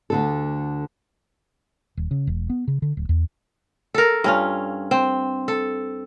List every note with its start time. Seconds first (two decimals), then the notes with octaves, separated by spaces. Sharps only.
0.10 D2 D3 A4
1.97 D#1
2.11 C#3
2.27 E1
2.50 B3
2.68 C#3
2.82 D3
2.97 D1
3.09 E2
3.94 A4 A#4
4.24 G2 C#4 F4
4.91 C4
5.48 A4